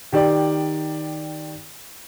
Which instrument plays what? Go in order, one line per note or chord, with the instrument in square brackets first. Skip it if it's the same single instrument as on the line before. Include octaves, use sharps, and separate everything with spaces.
[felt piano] D#3 G4 D5